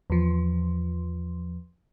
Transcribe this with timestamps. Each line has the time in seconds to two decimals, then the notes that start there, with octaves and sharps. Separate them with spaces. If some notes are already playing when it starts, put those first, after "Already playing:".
0.10 E2 F3